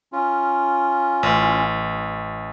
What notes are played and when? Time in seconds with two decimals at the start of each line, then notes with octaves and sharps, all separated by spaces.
0.12 C#4 F4
1.23 A1